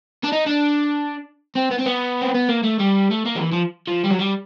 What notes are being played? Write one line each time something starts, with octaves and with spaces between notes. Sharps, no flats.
D4
D#4
D4
C4
B3
C4
B3
C4
B3
A#3
A3
G3
A3
A#3
F3
E3
F3
F3
G3
F#3
G3